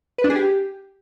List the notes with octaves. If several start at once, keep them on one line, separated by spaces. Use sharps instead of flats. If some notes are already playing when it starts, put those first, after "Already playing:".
B4
D4
G#4
G4